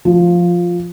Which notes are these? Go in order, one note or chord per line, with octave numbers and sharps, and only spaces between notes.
F3